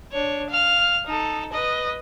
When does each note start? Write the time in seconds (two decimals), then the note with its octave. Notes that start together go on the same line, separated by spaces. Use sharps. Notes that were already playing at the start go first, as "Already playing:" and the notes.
0.12 D4 C#5
0.50 F5 F6
1.06 D#4 A4
1.52 B4 D#5